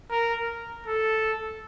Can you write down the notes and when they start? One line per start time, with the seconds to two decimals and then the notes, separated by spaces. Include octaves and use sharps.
0.11 A#4
0.87 A4